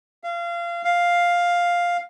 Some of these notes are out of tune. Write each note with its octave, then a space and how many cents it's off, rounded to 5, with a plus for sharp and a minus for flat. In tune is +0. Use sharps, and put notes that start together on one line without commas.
F5 -25
F5 +5